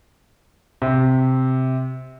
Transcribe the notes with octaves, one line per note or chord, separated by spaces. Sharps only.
C3